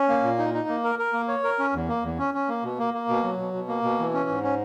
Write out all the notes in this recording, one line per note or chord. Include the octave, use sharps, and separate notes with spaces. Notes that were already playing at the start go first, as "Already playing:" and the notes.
Already playing: C#4
A#3
A#2
D#4
D#4
A#3
A#4
A#4
A#3
C#5
A#4
C#4
E2
A#3
E2
C#4
C#4
A#3
B2
A#3
A#3
B2
F#3
B2
B2
A#3
B2
E3
C#4
G#2
C#4